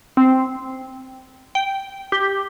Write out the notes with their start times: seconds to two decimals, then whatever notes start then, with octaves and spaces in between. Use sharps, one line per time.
0.17 C4
1.55 G5
2.12 G4